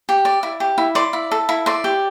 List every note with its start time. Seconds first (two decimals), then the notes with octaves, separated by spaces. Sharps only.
0.09 G4
0.25 D5
0.43 E4
0.60 G4
0.78 E4
0.95 D5 C6
1.13 E4
1.31 A4
1.49 E4
1.66 D5 C6
1.84 G4